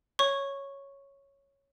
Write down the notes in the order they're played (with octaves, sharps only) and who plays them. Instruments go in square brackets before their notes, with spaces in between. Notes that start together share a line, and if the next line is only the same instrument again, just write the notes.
[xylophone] C#5 C#6